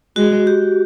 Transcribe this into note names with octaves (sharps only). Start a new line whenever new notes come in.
G#3 F#4
G4